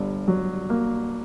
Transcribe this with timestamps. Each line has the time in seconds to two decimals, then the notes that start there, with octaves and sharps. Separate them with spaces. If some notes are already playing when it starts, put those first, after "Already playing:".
Already playing: G1 G2
0.28 F#3
0.70 A#3